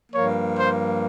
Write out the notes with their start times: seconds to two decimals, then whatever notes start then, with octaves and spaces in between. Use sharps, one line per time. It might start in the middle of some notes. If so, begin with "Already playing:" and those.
0.13 G2 F3 A#3 C#5
0.58 C5